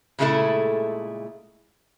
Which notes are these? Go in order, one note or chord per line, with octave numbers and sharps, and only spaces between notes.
A#2 C#3 G#3 A3 E4 A4